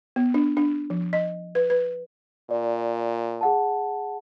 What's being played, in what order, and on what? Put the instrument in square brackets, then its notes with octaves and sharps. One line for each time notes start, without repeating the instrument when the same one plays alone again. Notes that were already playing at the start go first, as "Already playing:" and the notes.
[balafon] B3
D4
D4
F3
D#5
B4
B4
[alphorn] A#2 [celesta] D5
[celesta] G#4 F#5 A5